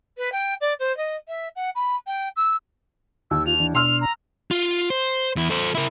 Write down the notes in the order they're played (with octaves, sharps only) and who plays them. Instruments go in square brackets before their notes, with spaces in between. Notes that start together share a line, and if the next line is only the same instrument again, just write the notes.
[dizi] B4
G5
D5
C5
D#5
E5
F#5
B5
G5
E6
[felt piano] D#2 [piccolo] E6
[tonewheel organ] F4 [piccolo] F7
[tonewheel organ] E3 D4
[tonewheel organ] B2 D4 [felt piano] C6 E6 F6 [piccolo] F7
[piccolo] A#5
[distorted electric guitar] F4
C5
E2 E4
A4 C5
E4 A#4